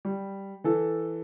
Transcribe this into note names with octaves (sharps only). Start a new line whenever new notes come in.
G3
E3 A4